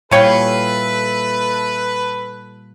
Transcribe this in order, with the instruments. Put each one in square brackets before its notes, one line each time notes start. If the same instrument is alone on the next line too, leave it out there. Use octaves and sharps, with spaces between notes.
[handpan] A#2 G3 F5 [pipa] E3 C#5 G5 [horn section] A4 B4